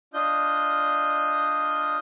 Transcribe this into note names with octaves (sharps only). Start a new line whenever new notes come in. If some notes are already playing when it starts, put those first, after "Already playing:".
D4 F4 D#5 G6